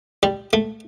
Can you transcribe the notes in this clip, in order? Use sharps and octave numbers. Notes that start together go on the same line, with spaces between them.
G3
A3